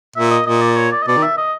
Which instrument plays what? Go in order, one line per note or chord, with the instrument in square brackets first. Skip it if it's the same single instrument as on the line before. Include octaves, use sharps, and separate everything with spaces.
[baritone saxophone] A#2 [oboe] E5
[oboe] D#5
[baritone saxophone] A#2 [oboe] D#5
[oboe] D5
C#5
D5
D#5
[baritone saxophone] B2 [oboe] D5
[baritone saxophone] D#3
[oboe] E5
D#5